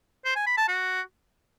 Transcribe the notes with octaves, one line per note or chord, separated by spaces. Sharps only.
C5
G#5
B5
A5
F#4